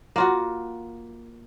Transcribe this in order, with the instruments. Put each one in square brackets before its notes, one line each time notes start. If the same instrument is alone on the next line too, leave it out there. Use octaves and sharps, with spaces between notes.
[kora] A#3 F4 F#4